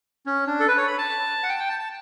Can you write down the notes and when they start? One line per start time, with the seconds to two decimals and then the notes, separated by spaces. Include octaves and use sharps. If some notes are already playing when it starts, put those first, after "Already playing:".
0.26 C#4
0.47 D4
0.60 A4
0.68 B4
0.77 C#5
0.87 B5
0.98 A5
1.43 F#5
1.49 G5
1.55 A5
1.59 G5
1.69 A5
1.79 A5